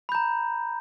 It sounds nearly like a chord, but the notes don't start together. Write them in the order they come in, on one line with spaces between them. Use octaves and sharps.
B5 G6 A#5